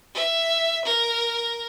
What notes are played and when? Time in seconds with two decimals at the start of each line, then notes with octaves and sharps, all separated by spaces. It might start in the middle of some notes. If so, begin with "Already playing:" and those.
0.15 E5
0.85 A#4